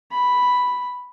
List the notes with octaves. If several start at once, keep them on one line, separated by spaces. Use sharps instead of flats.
B5